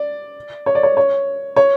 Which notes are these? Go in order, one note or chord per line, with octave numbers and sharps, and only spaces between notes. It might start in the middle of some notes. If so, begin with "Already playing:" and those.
Already playing: D5
C#5
D5
C#5
C#5
C#5